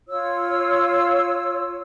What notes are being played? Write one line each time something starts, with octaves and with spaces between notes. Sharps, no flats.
F4 C#5 E6